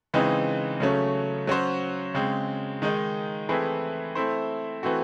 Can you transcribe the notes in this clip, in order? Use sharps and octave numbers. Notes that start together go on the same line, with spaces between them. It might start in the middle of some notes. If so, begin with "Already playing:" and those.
C#3 E3 G#3 C4 D#4
C#3 F#3 A3 C#4
F#3 C#4 F#4 C5
C#3 G#3 C4
D#3 G#3 D#4
E3 A3 C4 E4 G#4
A3 C4 E4 C5
E3 A3 C4 F#4